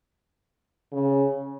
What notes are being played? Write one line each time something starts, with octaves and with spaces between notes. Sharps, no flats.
C#3